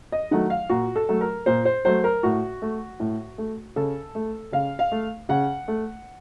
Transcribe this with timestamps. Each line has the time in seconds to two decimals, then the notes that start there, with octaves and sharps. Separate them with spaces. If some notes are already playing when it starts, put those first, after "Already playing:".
0.12 D#5
0.31 D#3 F#3 A3 F#5
0.50 F5
0.69 A#2 F#4
0.96 A4
1.09 F#3 A3
1.21 A#4
1.46 A#2 C5
1.65 C5
1.85 F#3 A3 C5
2.04 A#4
2.23 A2 F#4
2.62 A3
3.00 A2
3.38 A3
3.76 C#3 A4
4.15 A3
4.52 C#3 F5
4.79 F5
4.92 A3
5.29 C#3 F#5
5.68 A3